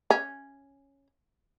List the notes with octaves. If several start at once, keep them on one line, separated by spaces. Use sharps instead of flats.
C#4